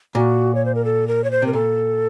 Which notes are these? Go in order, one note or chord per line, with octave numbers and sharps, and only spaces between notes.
A#2 F#4
C#5
C5
A#4
A4
A#4
C#5
C5
C3 A#4
A#2 A4